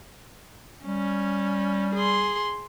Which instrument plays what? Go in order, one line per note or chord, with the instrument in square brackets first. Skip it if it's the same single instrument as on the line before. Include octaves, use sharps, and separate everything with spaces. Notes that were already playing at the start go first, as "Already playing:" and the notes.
[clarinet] G3 [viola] C#4
[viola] G#4 C6